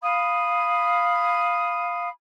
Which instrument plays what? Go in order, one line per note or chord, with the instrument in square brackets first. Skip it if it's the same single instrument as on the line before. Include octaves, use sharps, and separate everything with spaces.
[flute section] F5 B5 D#6